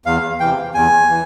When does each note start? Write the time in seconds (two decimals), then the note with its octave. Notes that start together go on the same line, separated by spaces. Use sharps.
0.06 E2 F5
0.40 C3 E3 G5
0.74 E2 G#5
1.10 E3